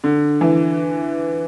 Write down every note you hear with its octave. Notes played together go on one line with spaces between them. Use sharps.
D3
E3